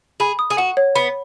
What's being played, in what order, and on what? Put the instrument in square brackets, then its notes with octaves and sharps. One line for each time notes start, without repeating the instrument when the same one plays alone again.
[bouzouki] G#4 [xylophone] B5
[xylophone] D#6
[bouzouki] G#4
[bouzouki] F#4 [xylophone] F#5
[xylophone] C#5
[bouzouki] B3 [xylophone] B5